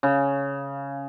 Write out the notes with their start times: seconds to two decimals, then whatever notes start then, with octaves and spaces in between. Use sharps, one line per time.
0.03 C#3